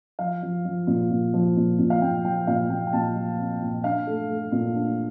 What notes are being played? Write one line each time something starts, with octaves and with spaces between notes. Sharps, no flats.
F3 F5
F3
F3
A#2
A#2
F3
A#2
A#2
F5
A#2 G5
F3 G5
A#2 F5
A#2 G5
G5
A#2 A5
F3
C4
A#2
D4 F5
A3
A3
A#2
D4